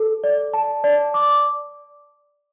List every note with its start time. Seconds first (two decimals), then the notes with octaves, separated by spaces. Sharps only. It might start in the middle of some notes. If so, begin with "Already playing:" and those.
Already playing: A4
0.24 D5
0.54 A5
0.84 D5
1.14 D6